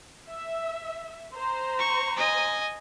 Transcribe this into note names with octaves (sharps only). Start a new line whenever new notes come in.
E5
C5 A#5
C#6
D#5 G#5